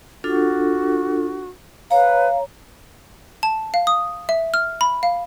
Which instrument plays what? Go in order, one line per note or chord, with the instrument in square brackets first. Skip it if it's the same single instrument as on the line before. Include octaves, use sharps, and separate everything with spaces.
[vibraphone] D4 F4 A4 [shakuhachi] F#4
[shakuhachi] B4 [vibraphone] C#5 A#5 [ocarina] F5
[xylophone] A5
F5
D#6
E5
F6
B5
F5